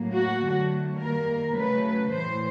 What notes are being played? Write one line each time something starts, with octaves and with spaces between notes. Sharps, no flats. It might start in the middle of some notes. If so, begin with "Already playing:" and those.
Already playing: A2 F#3 A#3
F#4
D3 F#3 A3
D#3 G3 A#3 A#4
C#3 F#3 A3 B4
A2 E3 G3 C5